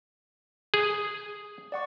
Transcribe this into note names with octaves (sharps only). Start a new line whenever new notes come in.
G#4 D#6
D5 F#5 C#6